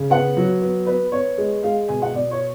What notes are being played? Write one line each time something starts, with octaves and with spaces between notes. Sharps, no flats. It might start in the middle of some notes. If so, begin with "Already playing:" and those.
Already playing: C#3
B3 F#5
F#3
B3
B3 B4
B3 C#5
G#3
G#3 F5
B2 G#5
F#5
B2 D5
C#5